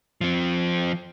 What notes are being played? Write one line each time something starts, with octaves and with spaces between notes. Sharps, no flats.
F3 C4